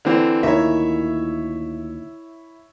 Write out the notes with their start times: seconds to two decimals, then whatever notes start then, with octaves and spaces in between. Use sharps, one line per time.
0.05 D3 E3 C4
0.43 D2 A#2 D#3 E4 C#5 E5